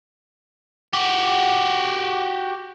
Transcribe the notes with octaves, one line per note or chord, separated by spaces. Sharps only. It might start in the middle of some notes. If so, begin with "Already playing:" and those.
F#4 G4